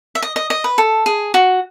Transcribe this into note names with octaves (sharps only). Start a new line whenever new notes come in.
E5
D#5
D#5
D#5
B4
A4
G#4
F#4